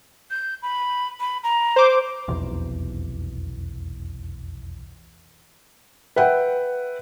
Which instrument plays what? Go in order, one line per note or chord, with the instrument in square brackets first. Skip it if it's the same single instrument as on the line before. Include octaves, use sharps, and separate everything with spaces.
[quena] G6
B5
B5
A#5
[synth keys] C5 D6
[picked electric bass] F1 B1 E2
[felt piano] B4 E5 F#5 G5